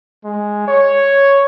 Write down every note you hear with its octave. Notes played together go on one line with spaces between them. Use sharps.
G#3
C#5